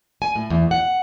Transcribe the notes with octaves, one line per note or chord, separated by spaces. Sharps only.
G#5
A2
E2
F#5